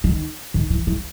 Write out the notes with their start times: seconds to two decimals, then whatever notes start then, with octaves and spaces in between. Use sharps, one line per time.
0.04 D#3
0.54 D#3
0.70 E3
0.87 E3